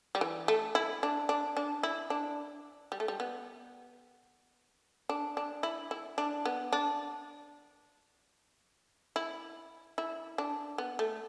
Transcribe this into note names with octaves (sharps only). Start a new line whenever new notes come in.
G3
E3
A3
E4
D4
D4
D4
E4
D4
G3
A3
G3
B3
D4
D4
E4
E4
D4
B3
D4
E4
E4
D4
B3
A3